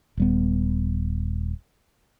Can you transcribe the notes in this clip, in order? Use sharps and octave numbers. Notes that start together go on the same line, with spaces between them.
D#1 G3 B3